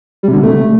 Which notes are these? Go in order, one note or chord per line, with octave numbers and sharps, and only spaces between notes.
G3
C3
D3
C3
A3